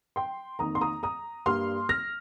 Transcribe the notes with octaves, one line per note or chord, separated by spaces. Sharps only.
G5 C6
F2 D#3 A#3 A#5 D#6
C6
A#5 D#6
A#5 D#6
G2 G3 A#3 C6 F6
F6 A#6